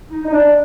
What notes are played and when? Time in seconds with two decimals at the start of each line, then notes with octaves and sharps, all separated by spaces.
0.10 D#4
0.25 D#4
0.32 D4